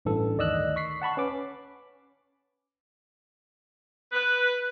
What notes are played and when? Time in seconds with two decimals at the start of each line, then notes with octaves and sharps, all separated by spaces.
0.05 A1 G2 E3 A4
0.38 D2 D#3 D5 D#5 E6 F#6
0.76 C#6 B6 C7
1.02 F#5 A5 B5 C#6
1.17 C#4 B4 D6
4.13 B4